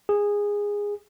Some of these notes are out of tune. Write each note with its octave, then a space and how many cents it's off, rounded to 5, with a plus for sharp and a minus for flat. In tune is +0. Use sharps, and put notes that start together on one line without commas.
G#4 -15